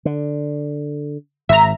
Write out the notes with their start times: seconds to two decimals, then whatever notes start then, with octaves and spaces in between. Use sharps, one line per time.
0.05 D3
1.49 G#1 G#2 E5 A#5